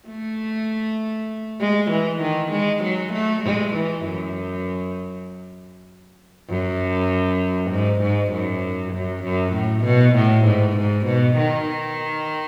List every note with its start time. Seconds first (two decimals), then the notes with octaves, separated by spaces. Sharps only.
0.09 A3
1.61 G#3
1.91 E3
2.22 D#3
2.52 G#3
2.84 F#3
3.13 A3
3.44 G#3
3.75 E3
4.05 F#2
6.50 F#2
7.71 G#2
8.02 G#2
8.33 F#2
8.94 F#2
9.24 F#2
9.55 A2
9.85 B2
10.16 A2
10.45 G#2
10.77 G#2
11.07 B2
11.38 D#3